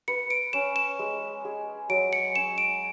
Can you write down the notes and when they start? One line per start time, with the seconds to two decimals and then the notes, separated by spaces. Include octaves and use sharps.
0.08 B4 C#7
0.30 D7
0.53 C#4 E7
0.76 E7
0.99 G#3
1.45 G#4
1.89 F#3 D7
2.13 C#7
2.35 C#4 E7
2.58 D7